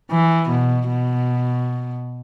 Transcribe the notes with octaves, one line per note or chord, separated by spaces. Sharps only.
E3
B2
B2